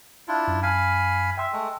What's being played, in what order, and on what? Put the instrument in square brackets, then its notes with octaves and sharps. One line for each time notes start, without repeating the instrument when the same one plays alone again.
[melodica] D4 E4 F4
[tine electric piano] F#2
[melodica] F5 G#5 B5
[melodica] E5 [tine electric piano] G5 C6 E6
[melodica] G#3 A3